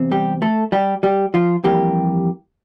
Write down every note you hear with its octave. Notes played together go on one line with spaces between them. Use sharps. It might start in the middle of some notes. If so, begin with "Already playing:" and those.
Already playing: E2 C3 C4
G3 G4
A3 A4
G3 G4
G3 G4
F3 F4
F2 E3 G3 A#3 G4